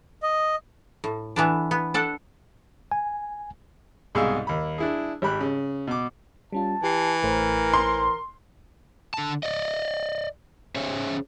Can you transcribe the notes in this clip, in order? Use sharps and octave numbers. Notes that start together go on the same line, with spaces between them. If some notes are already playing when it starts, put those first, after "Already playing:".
D#5
A2
E3 B3 D4
B3
D4 A4 F#5
G#5
C2 G#2 B2 G#4 F5 E6
D#2 B5
D4 E4 G#4
G#1 G4 B5 F#6
C#3
B2 D6
G3 C#4 F4 A5
E3 G4 C7
A1 A3 A#4 C5
C6
D3 A5
D5 D#5
C#4 G#4 C5 C#5 E5 G#5